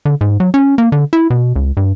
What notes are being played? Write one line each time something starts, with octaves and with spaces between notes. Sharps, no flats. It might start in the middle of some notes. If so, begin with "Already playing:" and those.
D3
G#2
F#3
C#4
A#3
D3
E4
B2
C#2
G2